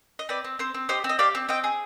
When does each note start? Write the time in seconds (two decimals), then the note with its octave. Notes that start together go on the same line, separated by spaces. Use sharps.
0.19 D#5
0.29 C4 B4 D5
0.44 C4
0.59 C4 C5
0.74 C4
0.89 G4 C5 D#5
1.04 C4
1.09 D#5
1.19 G4 D5 F5
1.35 C4
1.49 C4 D#5 G5
1.64 G#4